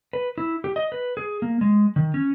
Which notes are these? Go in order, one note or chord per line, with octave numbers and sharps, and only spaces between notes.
B4
E4
G4
D#5
B4
G#4
A#3
G#3
D#3
C#4